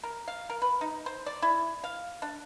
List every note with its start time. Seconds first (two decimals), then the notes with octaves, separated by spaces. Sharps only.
0.03 A#4
0.28 F5
0.50 A#4
0.62 B4
0.81 D#4
1.06 C5
1.26 D5
1.42 E4
1.84 F5
2.22 D4